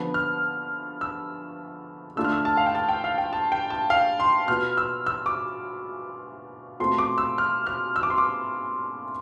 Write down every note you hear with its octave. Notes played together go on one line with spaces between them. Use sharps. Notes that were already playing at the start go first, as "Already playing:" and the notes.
Already playing: D3 F3 B3
F6
E6
D3 A3 D4 F4 E6
F6
E6
A5
F5
G5
A5
G5
F5
G5
A5
G5
A5
F5
C6
B2 B3 F4 F6
E6
E6
D6
B2 A3 C4 F4 C6
D6
E6
F6
F6
E6
D6
C6
D6